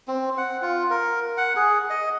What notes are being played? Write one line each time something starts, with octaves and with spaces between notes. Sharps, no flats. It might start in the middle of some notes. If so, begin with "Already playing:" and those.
C4
F#5
F4
A#4
F#5
G#4
D#5